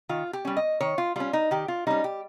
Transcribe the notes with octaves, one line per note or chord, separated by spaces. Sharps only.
D#3 F4
G4
G3 C#4
D#5
D#3 C#5
F4
G3 C#4 F4
D#4
D#3 G4
F4
G3 C#4 D#4
G4